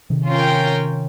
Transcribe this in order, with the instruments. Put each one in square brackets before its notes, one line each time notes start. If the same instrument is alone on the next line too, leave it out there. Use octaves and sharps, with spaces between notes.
[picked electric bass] C3 D#3
[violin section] C#4 F4 A#4 C#5 G5